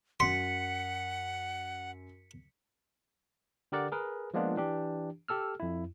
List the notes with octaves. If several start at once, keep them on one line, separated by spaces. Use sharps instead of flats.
F#2 F#5 C6 B6 C#7
D3 G4 A#4 D5 F#5
G#4 A#4 B4
F3 G#3 A#3 B3 D4 F4
E3 D4 G4
G4 A4 E6 F6
F2 E4